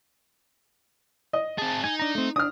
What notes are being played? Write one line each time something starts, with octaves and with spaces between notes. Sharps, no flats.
D#5
C4 G#4 A5
D#4 G#5
D4 A#5
A3 C4
D4 D#6 F6